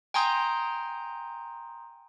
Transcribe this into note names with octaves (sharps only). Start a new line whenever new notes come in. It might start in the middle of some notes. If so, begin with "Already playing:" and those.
G5 G#5 A#5 C6 D#6 G6